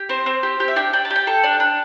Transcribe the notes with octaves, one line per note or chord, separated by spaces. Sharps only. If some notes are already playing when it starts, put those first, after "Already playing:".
Already playing: G4
C4 C5
C4
G4
G4
E5
D4 G5
D4 G5
A5
G4
G5
A4
D4
D4